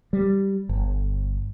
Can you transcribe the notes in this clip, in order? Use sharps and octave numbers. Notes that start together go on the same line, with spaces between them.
G3
G1